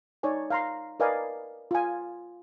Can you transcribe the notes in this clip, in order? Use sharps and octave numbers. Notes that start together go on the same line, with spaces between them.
D#4 C#5 D5 G#5
F5 A#5 C6
A#4 B4 D5 D#5 F5 G#5
F4 G#5